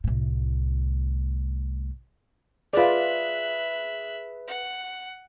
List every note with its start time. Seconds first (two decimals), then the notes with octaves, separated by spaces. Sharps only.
0.04 C2 A2
2.73 F4 G#4 B4 D5 E5 F#6
4.48 F#5